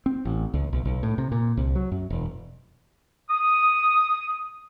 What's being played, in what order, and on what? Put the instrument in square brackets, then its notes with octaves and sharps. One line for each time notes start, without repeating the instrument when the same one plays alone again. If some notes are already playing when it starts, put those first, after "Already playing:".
[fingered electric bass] C4
A1
C#2
B1
B1
A2
C3
A#2
C2
F#3
F#2
E1
[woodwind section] D#6